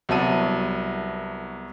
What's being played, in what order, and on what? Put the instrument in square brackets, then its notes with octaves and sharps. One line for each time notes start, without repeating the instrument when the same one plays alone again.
[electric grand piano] C2 F#3 B3 E5 A5 D#7